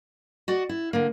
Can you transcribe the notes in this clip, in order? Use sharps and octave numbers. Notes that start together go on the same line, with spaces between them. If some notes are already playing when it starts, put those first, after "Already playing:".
F#4 D5 D#5
E4
D3 A#3